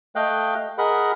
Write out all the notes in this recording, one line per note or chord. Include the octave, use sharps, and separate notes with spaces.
A3 D#5 F5 G5 F#6
G#4 A#4 D#5 F#5 B5